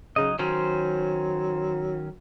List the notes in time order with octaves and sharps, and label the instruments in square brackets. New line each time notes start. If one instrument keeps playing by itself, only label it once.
[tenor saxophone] C#3 [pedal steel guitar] F#3 D#4 D#5
[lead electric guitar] D#3 C#4 [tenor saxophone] F#3 [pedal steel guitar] C5